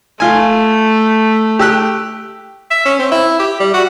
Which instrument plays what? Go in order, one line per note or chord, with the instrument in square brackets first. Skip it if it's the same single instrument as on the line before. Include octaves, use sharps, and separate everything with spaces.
[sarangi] A3 [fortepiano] F4 G#5
[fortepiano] G4 E6 F#6
[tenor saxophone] E5
C#4
C4
E4
G4
G3
F#4